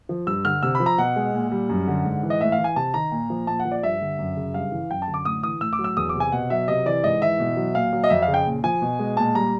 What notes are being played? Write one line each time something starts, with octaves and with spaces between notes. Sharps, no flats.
F3
G2 E6
D3 F6
C3 E6
B5
F3
A#5
B2 F#5
G#3
A#2
G3
F#2
D3
G#2
E3
D#5
A2 E5
F5
E3
G#5
C3 A5
D#3 A#5
A#2
F3
A#2 A5
F#5
F3
D5
G2 E5
D3
F#2
C#3
G2 F5
E3
F#2 G5
A5
D3
D6
A2 D#6
E3 D#6
A2 E6
D6
F#3
E6
E2 D#6
D6
C3
G#5
B2 F#5
F#3 E5
C3 D#5
E3 D5
G#2 D#5
E3 E5
B2
F#3
A#2 F5
F#3
D#5
F2 E5
F5
C#3
G5
A#2
F3 G#5
B2
G#3
A#2 A5
G3 A#5